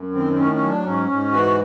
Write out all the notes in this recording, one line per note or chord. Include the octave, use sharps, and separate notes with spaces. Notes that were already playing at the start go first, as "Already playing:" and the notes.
Already playing: F#2
D#3 C4
C4
A2 C#4
C#4
F#3
D4
G#2 C#4
G#2
E3 F#4